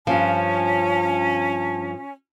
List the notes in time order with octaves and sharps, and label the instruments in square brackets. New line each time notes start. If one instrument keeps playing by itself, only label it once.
[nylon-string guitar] G2 F3 [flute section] C#4 [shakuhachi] A5